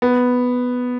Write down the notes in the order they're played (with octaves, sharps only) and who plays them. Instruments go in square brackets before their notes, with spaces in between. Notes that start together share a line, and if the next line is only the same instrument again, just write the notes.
[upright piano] B3